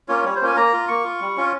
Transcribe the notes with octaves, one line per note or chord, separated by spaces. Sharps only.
A#3 C#4 F4 C#5
G3 C#5
C5
A#3 C#4 F4 G#5
A#3 A#5
F4
A#3 C#6
F4
G3
C#4 F4